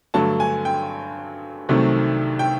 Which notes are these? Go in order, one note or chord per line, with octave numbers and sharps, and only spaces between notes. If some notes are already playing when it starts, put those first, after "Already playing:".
G2 D3 F#3 A3 A5
G#5
G5
C2 C3 D#3 F#3 A3
G5